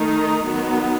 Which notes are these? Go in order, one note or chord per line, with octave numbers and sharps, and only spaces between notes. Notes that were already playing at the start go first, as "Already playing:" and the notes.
Already playing: D#3 A3 D#4
D#3 F#3 B3